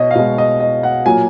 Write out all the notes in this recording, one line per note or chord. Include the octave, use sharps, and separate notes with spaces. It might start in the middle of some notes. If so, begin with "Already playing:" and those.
Already playing: B2 C#5 D#5
F5
B2 G#3 D#5
D#5
D#5
F#5
A#2 F#3 A#3 G#5